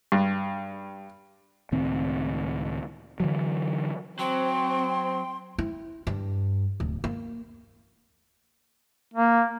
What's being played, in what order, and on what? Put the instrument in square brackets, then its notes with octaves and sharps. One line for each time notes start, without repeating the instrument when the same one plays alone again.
[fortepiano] G2
[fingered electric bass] C#2 A2 D#3 C4
D3 E3 F#3
[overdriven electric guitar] F#3 [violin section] C4 [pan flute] G5 [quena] C6
[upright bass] E4
G2
D1
A#3
[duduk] A#3